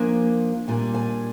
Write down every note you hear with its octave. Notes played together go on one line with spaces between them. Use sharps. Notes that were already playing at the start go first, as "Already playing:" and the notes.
Already playing: F3 A#3 D4 G#5
A#2 G3 D4 G#5
G#5